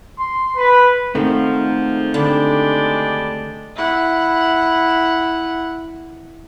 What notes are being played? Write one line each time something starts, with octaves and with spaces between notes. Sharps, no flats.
C6
B4
G#2 D#3 F3 A3 C4 C5 F#5
D3 G#3 D4 G4 D5 B5
E4 F#5